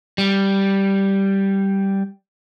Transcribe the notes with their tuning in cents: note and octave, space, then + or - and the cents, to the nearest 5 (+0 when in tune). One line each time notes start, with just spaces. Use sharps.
G3 -5